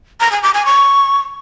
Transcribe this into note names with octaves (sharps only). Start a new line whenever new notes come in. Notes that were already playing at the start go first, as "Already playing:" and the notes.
A#5
G#5
D6
G#5
C#6